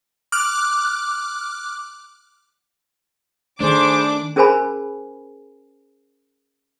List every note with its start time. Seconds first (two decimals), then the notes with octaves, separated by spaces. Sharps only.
0.32 D6 F6 F#6
3.61 D#3 A3 D4 G#4 C5 B5 D6
4.36 C#4 G#4 A#4 C5 G#5 B5